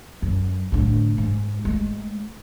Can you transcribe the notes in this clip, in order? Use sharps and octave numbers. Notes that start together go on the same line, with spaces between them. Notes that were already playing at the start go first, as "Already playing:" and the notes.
F#2
A2 D3
G#2
G#3 A3